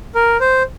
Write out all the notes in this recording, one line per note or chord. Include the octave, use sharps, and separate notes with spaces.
A#4
C5